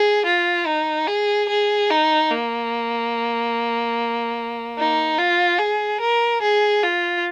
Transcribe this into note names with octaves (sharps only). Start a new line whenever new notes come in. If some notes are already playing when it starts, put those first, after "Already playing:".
Already playing: G#4
F4
D#4
G#4
G#4
D#4
A#3
D#4
F4
G#4
A#4
G#4
F4